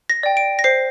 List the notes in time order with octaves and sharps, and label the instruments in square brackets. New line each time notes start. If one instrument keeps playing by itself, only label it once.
[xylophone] A#6
D5 G5
D7
A#6
C5 C7